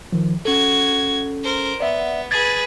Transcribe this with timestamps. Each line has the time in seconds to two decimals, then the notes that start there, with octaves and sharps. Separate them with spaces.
0.12 D#3 F3
0.45 C#4 F#4 A4 G#6
1.44 A#4 C5
1.80 B3 D5 E5 F#5
2.31 G#4 B4 G#6 A6